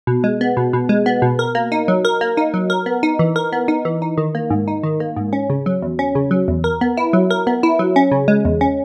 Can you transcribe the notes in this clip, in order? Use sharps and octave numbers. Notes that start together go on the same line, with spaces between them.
B2
G#3
B3
B2
B2
G#3
B3
B2
A#4
A#3
D#4
F#3
A#4
A#3
D#4
F#3
A#4
B3
D#4
E3
A#4
B3
D#4
E3
D#4
D#3
A#3
G#2
D#4
D#3
A#3
G#2
C#4
C#3
F#3
E2
C#4
C#3
F#3
E2
A#4
B3
E4
F#3
A#4
B3
E4
F#3
C#4
C#3
G#3
E2
C#4